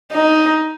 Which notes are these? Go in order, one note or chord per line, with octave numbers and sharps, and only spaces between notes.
D#4